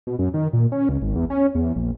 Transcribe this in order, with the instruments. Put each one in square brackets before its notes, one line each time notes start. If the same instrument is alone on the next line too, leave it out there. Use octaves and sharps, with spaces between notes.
[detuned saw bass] B2
F#2
D#3
A#2
C#4
C#2
G#1
E2
C#4
E2
A#1